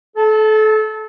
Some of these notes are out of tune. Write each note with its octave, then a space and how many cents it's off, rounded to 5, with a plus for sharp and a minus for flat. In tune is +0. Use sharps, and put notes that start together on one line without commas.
A4 -30 A5 +0